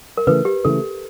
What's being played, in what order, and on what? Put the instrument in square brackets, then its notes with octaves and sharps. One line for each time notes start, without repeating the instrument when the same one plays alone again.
[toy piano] A#4
[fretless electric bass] C#3 E3 A3 [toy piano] B4
[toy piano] G4
[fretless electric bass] C#3 E3 A3 [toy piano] A4